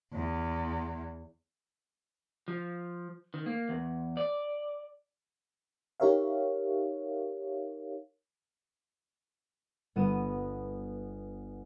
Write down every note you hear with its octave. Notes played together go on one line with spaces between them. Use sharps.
E2
F3
D#3
A#3
E2
D5
D#4 G4 A#4 C#5 E5 F5
G1 B3 D#7 E7